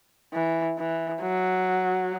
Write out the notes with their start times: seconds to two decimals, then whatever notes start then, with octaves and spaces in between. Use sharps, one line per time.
0.33 E3
0.78 E3
1.22 F#3